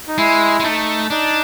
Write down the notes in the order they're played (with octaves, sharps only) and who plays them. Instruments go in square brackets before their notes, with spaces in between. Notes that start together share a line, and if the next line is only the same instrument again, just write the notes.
[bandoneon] D#4
[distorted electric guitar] G#3 [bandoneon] E4
[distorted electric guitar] G#3
[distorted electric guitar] A3 [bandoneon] D#4
[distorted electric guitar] D4 [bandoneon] D#4